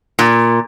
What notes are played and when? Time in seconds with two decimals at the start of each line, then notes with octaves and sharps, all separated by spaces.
0.19 A#2